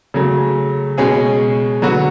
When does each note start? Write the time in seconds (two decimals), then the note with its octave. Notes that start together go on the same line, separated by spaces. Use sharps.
0.14 C#3 F#3 A3
0.98 B2 G#3 C#4 G#4
1.82 D3 F#3 B3 F#4